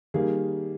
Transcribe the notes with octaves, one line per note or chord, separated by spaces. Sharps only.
D#3 G3 A#3 G#4